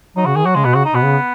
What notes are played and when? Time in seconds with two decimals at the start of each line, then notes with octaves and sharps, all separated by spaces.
0.16 F#3 D#4
0.25 C#3 F#4
0.35 D#3 G#4
0.46 F#3 F#4
0.55 C#3 G#3
0.65 B2 B3
0.74 C#3 F#4
0.85 D#4
0.94 B2 B3
1.04 C#3